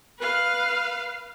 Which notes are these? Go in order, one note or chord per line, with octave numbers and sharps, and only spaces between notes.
B4 F5